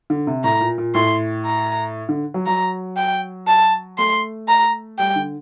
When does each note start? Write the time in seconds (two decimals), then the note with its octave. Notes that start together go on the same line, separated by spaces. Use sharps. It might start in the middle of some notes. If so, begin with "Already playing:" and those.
0.10 D3
0.27 C3
0.44 A2 A#5
0.61 A#2
0.78 A#2
0.94 A2 C6
1.45 A#5
2.09 D3
2.34 F#3
2.46 F#3 A#5
2.97 G5
3.47 A5
3.98 A3 C6
4.48 A#5
4.99 G3 G5
5.16 D3